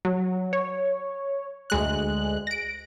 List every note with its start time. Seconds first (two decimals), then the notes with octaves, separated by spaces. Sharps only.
0.05 F#3
0.53 C#5
1.70 D2 G#3 F#6
2.47 A#6 D7